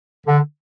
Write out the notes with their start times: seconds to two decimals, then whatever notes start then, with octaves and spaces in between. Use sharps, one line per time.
0.27 D3